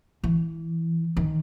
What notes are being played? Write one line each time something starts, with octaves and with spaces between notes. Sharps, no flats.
E3
D#3